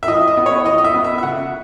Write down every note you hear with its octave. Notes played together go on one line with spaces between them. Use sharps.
E5
E3 D#5
D#5
B3
C#5
E3 D#5
D#5
E5
B3
E5
E5
C#3 F#5